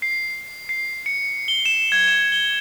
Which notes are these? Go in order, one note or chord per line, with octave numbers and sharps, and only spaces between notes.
C7
C7
C#7
G7
E7
G#6
E7
G7